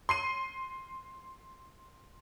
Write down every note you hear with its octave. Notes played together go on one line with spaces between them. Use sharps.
C6 C7 D#7